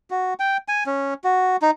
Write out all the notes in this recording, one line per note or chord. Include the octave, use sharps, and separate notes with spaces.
F#4
G5
G#5
C#4
F#4
D#4